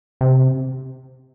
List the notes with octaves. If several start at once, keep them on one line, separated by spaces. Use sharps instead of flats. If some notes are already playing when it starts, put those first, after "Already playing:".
C3